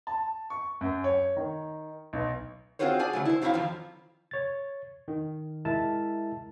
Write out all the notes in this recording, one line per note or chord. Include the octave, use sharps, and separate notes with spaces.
A5
C#6
F#2
C#5
D#3
B1
C4 F4 F#4 G#4 C5 C#5
G#4 D5 G#5
C#3 F#3 A3
E4 C5
F#2 F#3 C4 D4 E4 F5
F2 D#3 F3
C#5 A6
D#3
G#3 E4 A#4 E5 A5